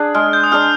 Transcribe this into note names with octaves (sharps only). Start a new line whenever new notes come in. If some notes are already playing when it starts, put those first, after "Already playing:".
Already playing: D4 G#4
G#3 F6
G6
D#6
D4 G#4 F6